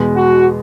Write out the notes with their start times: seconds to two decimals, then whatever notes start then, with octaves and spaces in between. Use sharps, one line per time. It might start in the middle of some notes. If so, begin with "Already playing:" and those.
Already playing: E2 B2 G#3
0.16 F#4